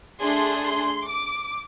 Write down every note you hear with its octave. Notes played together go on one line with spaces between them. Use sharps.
A3 D4 G#4 C6
C6
D6